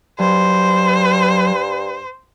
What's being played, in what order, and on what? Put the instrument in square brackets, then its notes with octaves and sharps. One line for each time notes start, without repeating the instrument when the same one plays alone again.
[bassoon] G2 [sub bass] F#3 [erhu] C5